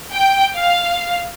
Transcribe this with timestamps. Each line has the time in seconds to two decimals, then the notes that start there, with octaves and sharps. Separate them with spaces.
0.14 G5
0.57 F5